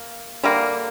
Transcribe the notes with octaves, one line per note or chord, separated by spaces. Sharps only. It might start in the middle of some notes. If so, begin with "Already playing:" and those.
Already playing: A#3
D3 G3 A#3